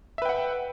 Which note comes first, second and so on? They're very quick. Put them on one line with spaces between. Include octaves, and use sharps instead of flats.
E5 B4 G5 F#5